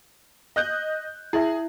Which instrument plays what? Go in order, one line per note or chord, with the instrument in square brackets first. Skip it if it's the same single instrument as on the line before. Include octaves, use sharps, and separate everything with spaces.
[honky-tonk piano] D#5 F#6 G6
[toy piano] E4 E5 [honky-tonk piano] G#4